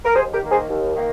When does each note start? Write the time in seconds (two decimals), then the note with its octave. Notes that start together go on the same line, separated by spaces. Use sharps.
0.05 A#4
0.15 D#2 G#4 C5
0.33 G4 A#4
0.42 D#3 A#3
0.50 G#4 C5
0.69 D#2
0.95 D#3 A#3